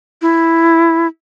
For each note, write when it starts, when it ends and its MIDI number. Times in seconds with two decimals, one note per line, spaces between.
0.22 1.07 64